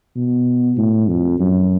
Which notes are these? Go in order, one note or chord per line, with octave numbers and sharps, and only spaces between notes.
B2
A2
F2
F#2